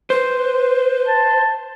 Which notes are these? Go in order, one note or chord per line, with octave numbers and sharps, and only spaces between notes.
B4 C5
A5